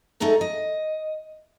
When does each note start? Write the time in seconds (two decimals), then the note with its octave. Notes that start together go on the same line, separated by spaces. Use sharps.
0.20 A3 B3 D#4 G#4 A4
0.41 D#5